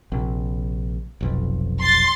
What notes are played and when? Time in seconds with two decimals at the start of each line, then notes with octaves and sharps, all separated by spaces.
0.12 A#1 C3
1.21 F1 B1 F2
1.80 C6 A6